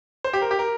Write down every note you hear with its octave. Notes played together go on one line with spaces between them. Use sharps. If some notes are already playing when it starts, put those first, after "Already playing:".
C5
G4
A#4
G4
A#4